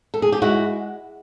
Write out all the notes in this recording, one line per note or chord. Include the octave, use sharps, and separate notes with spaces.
A4
G#4
G4
G#3 E4 F#4